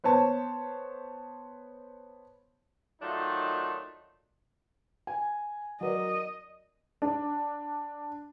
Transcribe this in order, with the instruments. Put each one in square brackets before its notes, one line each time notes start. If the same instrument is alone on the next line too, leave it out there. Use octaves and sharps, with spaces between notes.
[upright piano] B3 C5 C#5 A5
[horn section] D#3 F#3 A3 D4 D#4 F4
[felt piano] G#5
[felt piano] F#3 A#4 D5 [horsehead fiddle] D#5
[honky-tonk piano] D4